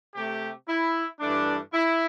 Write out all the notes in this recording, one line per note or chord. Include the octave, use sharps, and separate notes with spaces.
C3 A3 G4
E4
G2 E3 A3 D4
E4